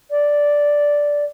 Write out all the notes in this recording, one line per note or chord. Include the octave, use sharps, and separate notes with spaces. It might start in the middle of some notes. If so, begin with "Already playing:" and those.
D5